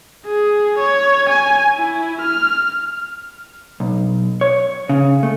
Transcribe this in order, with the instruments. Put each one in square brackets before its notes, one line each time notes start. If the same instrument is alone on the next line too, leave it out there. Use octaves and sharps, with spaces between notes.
[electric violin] G#4
C#5
G#5
E4
F6
[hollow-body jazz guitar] B1
C#5
C#3
A3